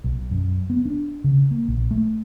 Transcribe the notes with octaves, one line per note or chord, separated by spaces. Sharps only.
B1
F#2
B3
D4
C#3
A#3
A#1
A3